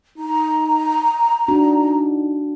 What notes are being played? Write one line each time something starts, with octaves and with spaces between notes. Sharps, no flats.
D#4 A#5
D4 D#4 F#4